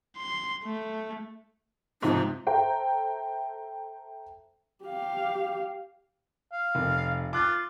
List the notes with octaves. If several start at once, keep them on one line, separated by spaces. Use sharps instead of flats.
C6
A3
G#2 C3 F3 D#4
A4 C5 E5 G5 A#5
G4 F5
F5
F1
F4 D6 F#6 A6